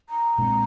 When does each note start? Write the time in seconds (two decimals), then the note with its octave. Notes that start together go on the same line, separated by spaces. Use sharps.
0.09 A#5
0.38 A#2 G#3 C4